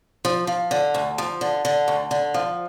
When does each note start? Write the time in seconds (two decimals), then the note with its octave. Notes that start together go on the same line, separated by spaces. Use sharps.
0.25 F3
0.47 F3
0.71 D3
0.94 D2
1.18 F3
1.41 D3
1.65 D3
1.88 D2
2.11 D3
2.34 F3